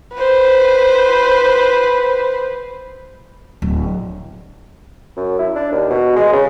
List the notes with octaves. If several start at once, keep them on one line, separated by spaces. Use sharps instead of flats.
B4 C5
D1
F#2
E4
D4
D#2
B2
G#3
C#3